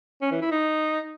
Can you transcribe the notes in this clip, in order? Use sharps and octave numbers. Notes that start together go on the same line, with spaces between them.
C#4
E3
E4
D#4